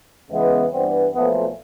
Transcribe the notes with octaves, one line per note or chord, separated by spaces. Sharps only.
E2 C#3 E3 G#3 B3
G2 E3 G3 B3 C4
B1 A#2 F3 A3 B3